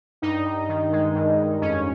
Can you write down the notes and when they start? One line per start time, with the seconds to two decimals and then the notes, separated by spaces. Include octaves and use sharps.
0.22 G2 D#4
0.45 G2
0.69 D#3
0.92 G#3
1.15 G2
1.39 G2
1.61 F2 C#4